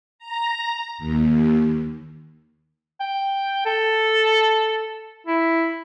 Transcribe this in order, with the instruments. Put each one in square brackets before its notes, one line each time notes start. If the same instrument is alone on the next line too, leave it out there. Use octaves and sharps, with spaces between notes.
[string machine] A#5
D#2
[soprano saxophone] G5
A4
E4